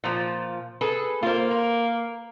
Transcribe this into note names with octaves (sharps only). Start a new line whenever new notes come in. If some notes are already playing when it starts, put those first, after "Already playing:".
A#2 F3
G#4 A4 B4
A#3 F4 C5
A#4